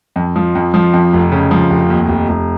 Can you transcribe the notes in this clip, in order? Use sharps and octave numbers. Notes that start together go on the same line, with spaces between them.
F2
F3
F2
F3
F2
F1
C#3
F3
F1
D#2
F1
F1